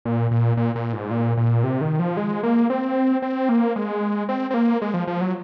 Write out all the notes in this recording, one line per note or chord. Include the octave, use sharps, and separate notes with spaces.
A#2
A#2
A#2
A#2
G#2
A#2
A#2
C3
D#3
F3
G#3
A#3
C4
C4
A#3
G#3
C4
C4
A#3
G#3
F3
F3
F#3